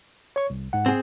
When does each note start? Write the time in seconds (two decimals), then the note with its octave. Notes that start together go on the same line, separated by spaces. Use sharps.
0.36 C#5 C#6
0.50 C2
0.73 G#2 F#5
0.86 C4 G#4